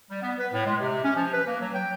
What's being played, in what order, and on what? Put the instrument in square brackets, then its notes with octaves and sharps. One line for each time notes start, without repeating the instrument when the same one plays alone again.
[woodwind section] G3
B3
B4
A2
G#3
C3
C#4
F3
B4
A#3
F#3
G5